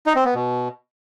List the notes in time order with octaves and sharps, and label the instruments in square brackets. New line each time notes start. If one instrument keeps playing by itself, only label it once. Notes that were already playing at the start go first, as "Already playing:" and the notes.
[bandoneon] D#4
C4
B3
B2